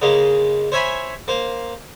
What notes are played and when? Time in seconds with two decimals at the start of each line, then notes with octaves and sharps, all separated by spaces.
0.02 C#3 G#3 A#3
0.72 C5 C#5 E5 G#5 B5
1.28 A#3 C5